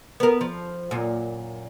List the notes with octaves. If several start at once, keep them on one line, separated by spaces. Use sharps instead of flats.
B3 A#4
F3
F#2 A#2